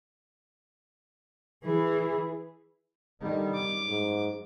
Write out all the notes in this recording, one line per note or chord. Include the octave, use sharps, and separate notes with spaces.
E3 G#4
D3 D#3 G3
F#2 D6
G#2